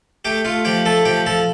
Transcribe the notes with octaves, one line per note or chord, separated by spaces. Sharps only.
A3 G4 G5
A3 F4 F5
F3 G4 G5
A3 A4 A5
F3 G4 G5
F3 A4 A5